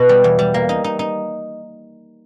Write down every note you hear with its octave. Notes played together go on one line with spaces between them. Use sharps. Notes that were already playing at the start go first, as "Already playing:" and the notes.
Already playing: B2
G3
E2
G3
A#3
D#4
D#4
D#4